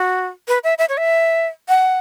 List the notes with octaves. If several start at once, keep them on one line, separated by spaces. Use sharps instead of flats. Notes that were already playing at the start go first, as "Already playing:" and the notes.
Already playing: F#4
B4
E5
E5
C#5
E5
F#5